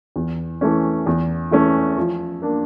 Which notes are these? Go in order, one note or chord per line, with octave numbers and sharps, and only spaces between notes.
E2
E3 A3 C#4
E2
E3 A3 C#4
F3
A#3 D4